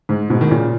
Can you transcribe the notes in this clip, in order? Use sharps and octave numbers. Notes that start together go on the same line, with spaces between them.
G#2
G#2 B2
D#3
A#2 C#3